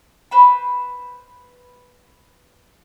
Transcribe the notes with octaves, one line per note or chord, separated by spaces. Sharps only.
B4 C5 B5